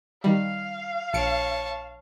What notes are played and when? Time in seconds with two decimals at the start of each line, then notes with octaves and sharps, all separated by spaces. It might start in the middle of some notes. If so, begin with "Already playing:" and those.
0.24 D#3 G3 F5
1.14 A#1 C#5 A5 C#7 D7